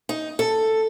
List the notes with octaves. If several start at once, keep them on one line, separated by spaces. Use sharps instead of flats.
D#4
A4